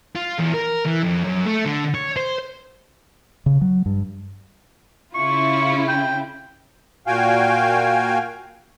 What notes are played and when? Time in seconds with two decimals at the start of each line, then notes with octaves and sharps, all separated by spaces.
0.16 F4
0.39 E2
0.54 A#4
0.87 E3
1.03 F2
1.24 F#2
1.46 A3
1.65 D3
1.95 C#5
2.17 C5
3.46 C#3
3.61 F#3
3.86 G2
5.15 C#3 E4 F4 C#6
5.88 G5
7.07 A#2 F#4 F5 G5 G#5